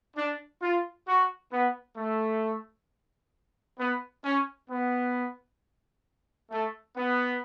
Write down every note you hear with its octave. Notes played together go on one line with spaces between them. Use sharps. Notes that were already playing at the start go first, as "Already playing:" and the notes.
D4
F4
F#4
B3
A3
B3
C#4
B3
A3
B3